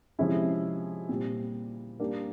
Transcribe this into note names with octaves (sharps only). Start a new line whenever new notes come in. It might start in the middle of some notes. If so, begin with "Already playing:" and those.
C3 F3 G#3 C#4 E4
A#2 G3 C4
G3 A#3 D4 G4 A#4